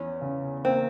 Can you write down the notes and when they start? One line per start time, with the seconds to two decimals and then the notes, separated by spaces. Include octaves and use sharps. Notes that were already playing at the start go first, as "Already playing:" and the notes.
Already playing: E2 C#4
0.21 C#3
0.65 A#3 C4